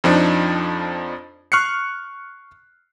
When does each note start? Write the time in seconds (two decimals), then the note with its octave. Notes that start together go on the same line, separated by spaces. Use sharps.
0.04 F2 F3 D4 D#4
1.52 C#6 F6 F#6 C7 C#7